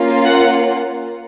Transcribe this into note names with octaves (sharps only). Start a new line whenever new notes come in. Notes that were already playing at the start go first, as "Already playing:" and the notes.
Already playing: A#3 C#4 F4
F#5